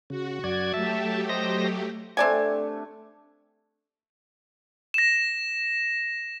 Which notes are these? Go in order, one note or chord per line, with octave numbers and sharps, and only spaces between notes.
C#3 F#4
F#2 D5 G#6
F#3 A3 G4 E5 A5
C5 D#5 A#6
C3 A3 C4 D4 D5 G#5
A#6 E7